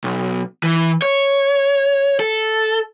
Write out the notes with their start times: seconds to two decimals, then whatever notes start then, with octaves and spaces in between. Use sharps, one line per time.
0.04 B1
0.63 E3
1.02 C#5
2.19 A4